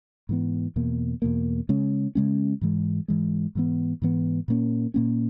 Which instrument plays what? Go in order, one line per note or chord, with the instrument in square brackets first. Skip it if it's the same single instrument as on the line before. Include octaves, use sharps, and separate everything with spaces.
[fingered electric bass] G#2 E3 B3
E2 B2 A#3
E2 B2 A#3
C#3 G#3 C#4
C#3 G#3 C#4
G#2 E3 G#3
G#2 E3 G#3
G#2 E3 B3
G#2 E3 B3
A#2 A#3 C#4
A#2 A#3 C#4